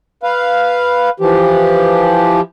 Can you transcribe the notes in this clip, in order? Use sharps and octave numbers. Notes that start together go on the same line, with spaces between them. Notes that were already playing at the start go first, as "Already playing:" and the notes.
B4 F5
E3 F3 G4